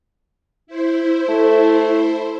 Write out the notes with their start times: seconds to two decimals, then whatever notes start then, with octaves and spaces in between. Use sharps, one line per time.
0.67 E4 C5
1.29 A3